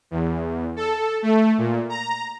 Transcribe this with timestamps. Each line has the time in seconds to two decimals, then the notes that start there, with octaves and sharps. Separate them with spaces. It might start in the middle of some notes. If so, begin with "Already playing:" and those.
0.11 E2
0.76 A4
1.22 A3
1.58 A#2
1.89 A#5